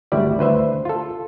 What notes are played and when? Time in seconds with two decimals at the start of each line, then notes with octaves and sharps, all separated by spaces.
0.12 G#1 D2 G3 E4 D5
0.39 D2 B4 C5 E5
0.85 F4 A4